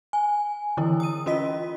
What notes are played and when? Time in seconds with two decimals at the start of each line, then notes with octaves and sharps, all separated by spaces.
0.13 G#5
0.77 D3 E3 E4
1.00 D#6 D#7
1.26 C#4 F4 D#5 B6